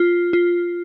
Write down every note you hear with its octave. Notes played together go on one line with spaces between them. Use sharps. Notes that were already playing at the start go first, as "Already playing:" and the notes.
Already playing: F4
F4